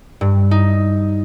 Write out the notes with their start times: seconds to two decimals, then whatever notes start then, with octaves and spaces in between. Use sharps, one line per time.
0.21 G2
0.51 D#4